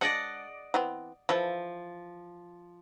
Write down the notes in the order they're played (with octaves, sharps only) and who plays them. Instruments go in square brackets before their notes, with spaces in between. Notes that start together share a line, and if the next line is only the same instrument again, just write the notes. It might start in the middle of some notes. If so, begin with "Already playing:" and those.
[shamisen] G#3 D4 [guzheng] D5 D#5 F#5
[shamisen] E3 B3 C4
[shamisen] E3 E4 A4 [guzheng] F3